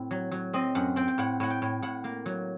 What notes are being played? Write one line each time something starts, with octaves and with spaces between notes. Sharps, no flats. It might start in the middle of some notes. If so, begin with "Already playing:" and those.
Already playing: A2 C4
F#3
F#3
C4 D#5
F#2 F#5
C4 G5
G5
A2 F#5
A2 F#5
G5
A2
A2 F#5
A#3
F#3